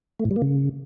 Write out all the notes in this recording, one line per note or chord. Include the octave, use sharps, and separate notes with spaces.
A3
A2
G3
A#3
C#3